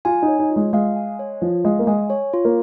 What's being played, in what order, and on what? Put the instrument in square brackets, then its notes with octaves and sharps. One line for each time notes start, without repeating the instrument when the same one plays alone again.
[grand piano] F4 [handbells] G#5
[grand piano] D#4
[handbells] C#5
[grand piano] D#4
[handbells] F4
[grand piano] G#3
[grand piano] G#3 [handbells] F5
[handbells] G#5
C#5
[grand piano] F3 [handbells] F4
[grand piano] G#3 [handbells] F5
[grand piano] A#3
[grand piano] G#3 [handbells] G#5
[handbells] C#5
F4
[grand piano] A#3